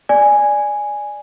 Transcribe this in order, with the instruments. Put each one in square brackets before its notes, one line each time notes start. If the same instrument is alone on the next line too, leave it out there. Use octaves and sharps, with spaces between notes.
[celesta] D5 G#5